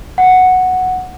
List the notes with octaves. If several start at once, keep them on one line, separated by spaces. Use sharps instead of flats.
F#5